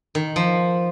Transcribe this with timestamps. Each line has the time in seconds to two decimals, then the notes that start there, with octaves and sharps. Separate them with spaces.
0.15 D#3
0.36 F3